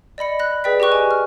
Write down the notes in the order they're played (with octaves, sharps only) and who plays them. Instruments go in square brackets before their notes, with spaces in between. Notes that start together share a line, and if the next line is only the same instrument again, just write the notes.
[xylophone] D5 D#5 B5 C#7
B5 F#6 A#6
G#4 B4 D5 G5 B6
G4 D#5 G5 C#6 F#6
G#5
F6